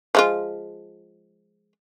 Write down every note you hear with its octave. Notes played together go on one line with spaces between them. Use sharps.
F3 G#3 F4